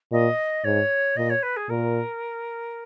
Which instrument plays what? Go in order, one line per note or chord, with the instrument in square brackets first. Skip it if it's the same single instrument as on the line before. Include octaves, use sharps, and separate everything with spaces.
[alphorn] A#2 [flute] D#5
[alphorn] G#2 [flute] C#5
[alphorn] A#2 [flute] D#5
[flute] C#5
B4
G#4
[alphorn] A#2 [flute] A#4